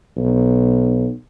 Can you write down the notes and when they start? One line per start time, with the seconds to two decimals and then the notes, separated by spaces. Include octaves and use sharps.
0.17 B1